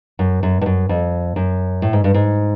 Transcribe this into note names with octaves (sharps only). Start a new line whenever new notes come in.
F#2
F#2
G2
F#2
F2
F#2
A2
G#2
G2
G#2